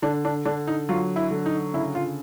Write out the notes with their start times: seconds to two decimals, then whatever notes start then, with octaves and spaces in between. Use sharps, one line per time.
0.02 D3 D4
0.25 D4
0.45 D3 D4
0.67 D#4
0.89 F#3 F4
1.16 E4
1.30 D3
1.46 D#4
1.74 C#3 E4
1.95 F4